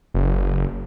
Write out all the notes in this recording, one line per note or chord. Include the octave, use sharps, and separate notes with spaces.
F#1